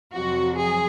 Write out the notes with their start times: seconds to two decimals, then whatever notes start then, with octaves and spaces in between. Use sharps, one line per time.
0.13 F2 C3 F#3 F#4
0.58 G#4